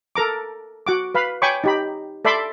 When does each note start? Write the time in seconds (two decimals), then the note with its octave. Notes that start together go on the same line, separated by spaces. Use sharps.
0.16 A4 A#4 A#5 D6
0.87 F#4 F#5 D6
1.15 B4 F5 B5
1.42 C#5 G5 G#5 B5 C#6 D6
1.64 D#4 G4 B5
2.25 A4 D5 E5 B5 C6 D6